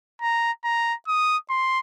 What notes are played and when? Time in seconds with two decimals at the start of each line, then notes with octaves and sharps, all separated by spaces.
0.22 A#5
0.64 A#5
1.08 D#6
1.50 C6